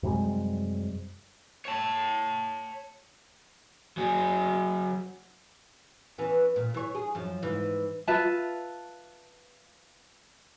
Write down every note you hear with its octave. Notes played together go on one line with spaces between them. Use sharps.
F#2 C3 G3 G#3
C#5 A5
F#3 G#4
E3 B3 C#4
A#2
E3 C#5
G#4
F#2 F3
G#2 E3
F4 B4 E5 A5